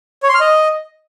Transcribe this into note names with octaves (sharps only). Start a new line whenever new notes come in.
C#5
C6
F6
D#5